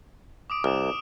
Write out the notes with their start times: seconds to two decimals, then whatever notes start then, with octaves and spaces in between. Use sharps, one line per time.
0.50 D6 D#6 D7
0.64 C2 F6 E7